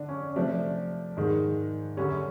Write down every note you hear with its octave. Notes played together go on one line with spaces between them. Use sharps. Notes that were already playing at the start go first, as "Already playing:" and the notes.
Already playing: D3 D4
C#4
C3 F3 A3 D4
G#2 D#3 G#3
F#2 D3 G3 C#4